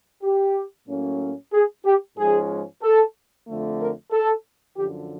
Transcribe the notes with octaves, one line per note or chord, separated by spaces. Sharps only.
G4
A2 F#3 A#3 C#4
G#4
G4
G#2 F3 G#3 C#4 G#4
A4
F2 D3 F3 A3
A#4
A4
F#2 D3 F3 G4